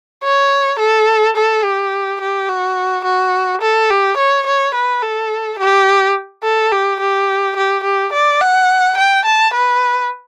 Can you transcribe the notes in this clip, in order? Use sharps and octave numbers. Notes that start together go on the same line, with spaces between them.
C#5
A4
A4
G4
G4
F#4
F#4
A4
G4
C#5
C#5
B4
A4
G4
A4
G4
G4
G4
G4
D5
F#5
G5
A5
B4